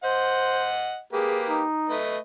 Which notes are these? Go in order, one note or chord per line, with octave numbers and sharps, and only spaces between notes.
C5 D#5 F#5
A#3 G4 G#4 B4
D#4
A3 B4 D#5